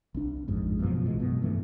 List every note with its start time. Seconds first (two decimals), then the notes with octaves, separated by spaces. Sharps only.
0.14 C2 D4
0.48 A1 F2 G#2
0.79 F#2 B2 E3 F3
1.05 B1 A2 E3 G#3
1.20 F#2 B2
1.42 G2 E3 A3